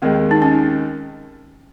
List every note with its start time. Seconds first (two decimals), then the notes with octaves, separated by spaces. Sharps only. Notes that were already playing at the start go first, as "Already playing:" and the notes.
0.02 D#2 D#3 G#3 C4
0.31 D#4
0.42 C#4